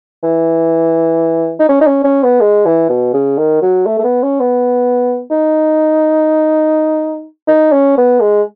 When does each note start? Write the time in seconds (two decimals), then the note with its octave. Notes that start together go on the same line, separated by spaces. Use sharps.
0.23 E3
1.59 D#4
1.69 C#4
1.81 D#4
1.87 C#4
2.04 C#4
2.23 B3
2.40 G#3
2.65 E3
2.89 B2
3.13 C#3
3.38 D#3
3.62 F#3
3.86 A3
3.99 A3
4.04 B3
4.23 C#4
4.40 B3
5.30 D#4
7.48 D#4
7.72 C#4
7.97 B3
8.20 G#3